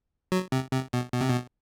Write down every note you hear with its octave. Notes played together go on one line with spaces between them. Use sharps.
F#3
C3
C3
B2
B2
C3
B2